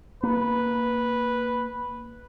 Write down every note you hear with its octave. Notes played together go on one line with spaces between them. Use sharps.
A#3 B4